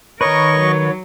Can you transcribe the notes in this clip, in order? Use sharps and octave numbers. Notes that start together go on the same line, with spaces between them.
D#3 A#4 B4 C#5 D#5 C#6
F#3